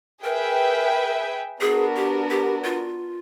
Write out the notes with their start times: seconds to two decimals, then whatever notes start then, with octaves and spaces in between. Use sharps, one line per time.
0.24 G#4 A#4 B4 E5 G5
1.61 B3 D4 F#4 G#4 A#4
1.96 G4
2.30 G4
2.65 F4